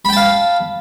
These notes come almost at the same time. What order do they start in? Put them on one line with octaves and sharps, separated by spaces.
B5 G5 A5 F5